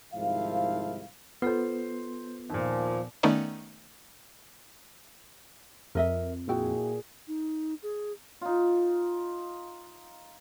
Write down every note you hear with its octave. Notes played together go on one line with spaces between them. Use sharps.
C2 G#2 D#3 F3 E4 F5
B3 F4 A4 C5 C7
D#2 A#2 F3
D#3 A3 B3 C#4 D#4 D5
F2 A#4 D#5 E5
A#2 E4 F#4 G#4 G5
D#4
G#4
D#4 F4